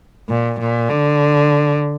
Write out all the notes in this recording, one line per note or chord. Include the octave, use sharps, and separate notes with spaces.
A#2
A#2
D3